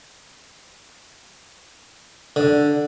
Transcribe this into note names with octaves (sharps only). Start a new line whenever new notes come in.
D3